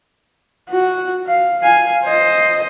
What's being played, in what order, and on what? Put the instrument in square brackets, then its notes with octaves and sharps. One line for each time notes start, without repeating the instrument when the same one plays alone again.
[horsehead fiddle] F#4
F5
F5 G#5
C5 D#5